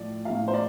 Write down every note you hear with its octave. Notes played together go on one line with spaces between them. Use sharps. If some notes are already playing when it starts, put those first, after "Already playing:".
Already playing: A2 F3 D5
A2 F3 F5
C5
D5